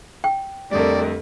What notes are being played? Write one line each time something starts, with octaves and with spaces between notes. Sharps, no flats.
G5
F2 D3 G3 A3 A#4 D5